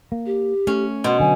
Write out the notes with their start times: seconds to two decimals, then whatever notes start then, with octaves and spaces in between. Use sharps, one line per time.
0.12 A#3
0.26 G4
0.67 A3 C#4
1.04 B2 C6
1.20 D3 F#3 G#5